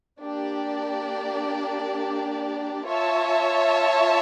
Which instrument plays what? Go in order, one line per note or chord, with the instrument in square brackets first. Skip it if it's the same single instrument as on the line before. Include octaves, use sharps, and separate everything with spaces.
[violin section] A#3 D4 G4 D5
F4 C#5 E5 A5